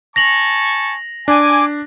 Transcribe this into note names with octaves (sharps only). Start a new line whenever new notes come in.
G#5 A5 C#6 A#6 F7 F#7
D4 G#5 D6